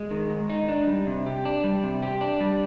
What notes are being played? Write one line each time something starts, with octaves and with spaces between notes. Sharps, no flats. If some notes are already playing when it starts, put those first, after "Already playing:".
Already playing: G#3
D#3
G#2
D#4
D4
G3
C3
G4
D4
G3
C3
G4
D4
G3